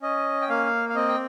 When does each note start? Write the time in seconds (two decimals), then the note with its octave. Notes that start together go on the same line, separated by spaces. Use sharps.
0.02 C#4 D#5
0.41 G5
0.49 A#3 F5
0.89 F5
0.95 C4 D#5
1.08 G5